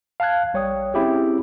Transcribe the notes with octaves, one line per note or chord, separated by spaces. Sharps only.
F5 A5 F6 F#6 G#6
A#1 G3 C#5 G5 D#6
C4 C#4 E4 G4 G#4